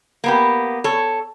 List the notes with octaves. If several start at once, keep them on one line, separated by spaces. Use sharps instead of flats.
A#3 B3 G4
A4 C#5